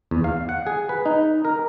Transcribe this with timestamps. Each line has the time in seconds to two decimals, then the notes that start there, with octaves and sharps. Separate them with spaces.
0.11 E2
0.24 F5
0.49 F#5
0.67 G#4
0.89 B4
1.06 D#4
1.45 A#4